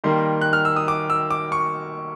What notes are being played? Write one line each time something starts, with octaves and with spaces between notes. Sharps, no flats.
D#3 G3 A#3 C6
F#6
F6
E6
D#6
D6
E6
D6
C#6